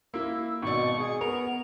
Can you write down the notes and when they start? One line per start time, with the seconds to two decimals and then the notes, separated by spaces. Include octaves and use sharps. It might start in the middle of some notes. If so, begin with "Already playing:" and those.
0.14 A#3 E4 E6
0.62 G#1 B2 D5 C#6
0.99 G#4
1.21 B3 A#4 F7